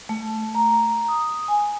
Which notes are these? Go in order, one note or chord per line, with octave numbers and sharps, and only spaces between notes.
A3
A#5
D#6
G#5